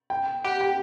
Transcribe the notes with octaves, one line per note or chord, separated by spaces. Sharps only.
G5
G4 F#5
G5